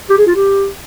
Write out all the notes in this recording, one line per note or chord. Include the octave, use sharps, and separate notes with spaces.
G4
G#4
F4
G4